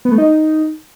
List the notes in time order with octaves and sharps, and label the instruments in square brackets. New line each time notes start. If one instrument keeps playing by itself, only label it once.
[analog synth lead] B3
A3
D#4